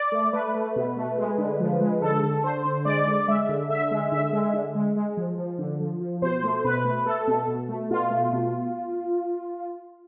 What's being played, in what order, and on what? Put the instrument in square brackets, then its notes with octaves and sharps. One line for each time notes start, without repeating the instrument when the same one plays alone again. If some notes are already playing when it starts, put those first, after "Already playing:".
Already playing: [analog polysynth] D5
A3
A3 B4
A3
B2
A3
G#3
D3
F3
G#3
D3 A4
D3
D3 C5
D3
G#3 D5
D3
G#3 E5
D3
D3 E5
G#3
D3 E5
G#3
D3
G#3
G#3
F3
F3
D3
F3
F3
B2 C5
A3
B2 B4
A3
A3 A4
B2
B2
A3
B2 F4
A3
B2